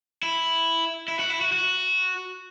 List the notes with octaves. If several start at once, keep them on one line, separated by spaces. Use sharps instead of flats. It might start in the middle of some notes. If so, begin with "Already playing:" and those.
E4
E4
F#4
E4
F#4
F#4